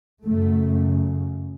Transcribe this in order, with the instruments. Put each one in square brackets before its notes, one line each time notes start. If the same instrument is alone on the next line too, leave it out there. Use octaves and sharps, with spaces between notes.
[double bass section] F#2 C#3 A3